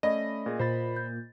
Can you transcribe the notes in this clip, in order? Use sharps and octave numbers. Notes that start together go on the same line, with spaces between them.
A3 C#4 D5 D#5 B5
A#2 G#4
A#2 F4 C5 B5 A6
G6